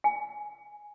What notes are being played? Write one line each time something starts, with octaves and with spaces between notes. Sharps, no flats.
G#5